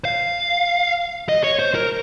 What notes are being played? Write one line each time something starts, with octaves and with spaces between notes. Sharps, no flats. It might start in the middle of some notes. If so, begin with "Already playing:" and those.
F5
D#5
C#5
C5
A#4